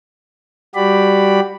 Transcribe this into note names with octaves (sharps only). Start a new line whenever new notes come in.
G3 F#4 G4 D5 B5